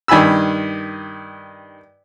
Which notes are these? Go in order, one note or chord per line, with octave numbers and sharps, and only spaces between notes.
G2 D#3 G#5 B5 E6